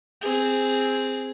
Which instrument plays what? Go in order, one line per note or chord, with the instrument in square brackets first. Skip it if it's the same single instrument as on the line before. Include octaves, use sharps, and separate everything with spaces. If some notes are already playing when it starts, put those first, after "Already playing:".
[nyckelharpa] C4 G#4